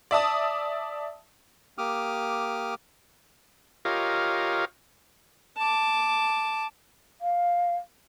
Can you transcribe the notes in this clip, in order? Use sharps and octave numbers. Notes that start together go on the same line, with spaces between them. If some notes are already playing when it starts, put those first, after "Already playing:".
D5 E5 A5 D#6
A#3 G4 D6 D#6 F6
F4 G4 A#4 C#5 D#5 F5
A5 D6
F5